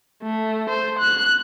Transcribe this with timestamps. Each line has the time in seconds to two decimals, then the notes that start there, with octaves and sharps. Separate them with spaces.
0.23 A3
0.70 C5
0.99 F#6